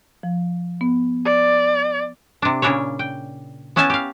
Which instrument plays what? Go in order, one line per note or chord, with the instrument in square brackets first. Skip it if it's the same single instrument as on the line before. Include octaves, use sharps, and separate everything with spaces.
[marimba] F3
B3
[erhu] D5
[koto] C3 D4
A#2 C#3 D4 E4 C#5
G5
B3 C#4 E4 G#5 A5
G4 F5